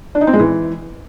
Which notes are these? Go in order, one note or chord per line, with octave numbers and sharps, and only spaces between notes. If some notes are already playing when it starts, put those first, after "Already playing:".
D4
D#4
C4
G#3
E3